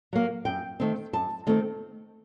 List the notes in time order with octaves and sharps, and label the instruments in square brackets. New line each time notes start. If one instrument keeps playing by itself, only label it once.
[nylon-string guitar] F#3 A#3
F#2 G5
D#3 A3 C4
F#2 A5
D#3 A3 C4